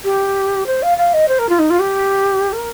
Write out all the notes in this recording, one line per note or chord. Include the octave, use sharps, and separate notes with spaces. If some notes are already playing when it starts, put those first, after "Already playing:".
G4
C5
F5
F5
D#5
C5
A#4
F4
D#4
F4
G4
A#4